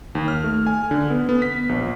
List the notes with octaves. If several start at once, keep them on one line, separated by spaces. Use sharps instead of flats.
D#2
F6
A3
G#5
D3
B3
B3
B6
A#1